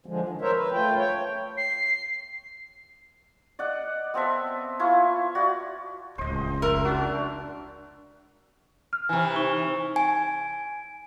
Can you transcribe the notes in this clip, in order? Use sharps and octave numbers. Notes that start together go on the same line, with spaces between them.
D3 F3 G#3
D#3
A#4 C5 C#5 E5
B4
A3 F4 G5
C#5 G5
C7
D5 D#5 F#5
B3 C4 A4 E5
E4 F4 C#6
F#4 D5
D1 C#2 C5 D#5
F1 A#4 E5
D4 F#4
F6
C3 E3 G#5
D#4 C#6 G7
G#5